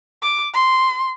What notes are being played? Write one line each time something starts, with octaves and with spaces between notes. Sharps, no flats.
D6
C6